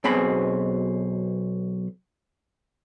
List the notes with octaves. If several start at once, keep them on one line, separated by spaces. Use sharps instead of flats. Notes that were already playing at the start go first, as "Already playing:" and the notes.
B1 B2 C4 G#4 B5